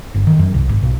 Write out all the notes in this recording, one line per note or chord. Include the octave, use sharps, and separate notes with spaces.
G1
D#3
F#2
C2
G#1
B1